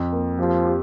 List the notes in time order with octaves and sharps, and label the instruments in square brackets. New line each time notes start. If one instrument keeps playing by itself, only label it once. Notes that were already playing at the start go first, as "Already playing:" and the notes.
Already playing: [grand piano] F2
A#3
[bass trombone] F3 [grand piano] G4
[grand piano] G4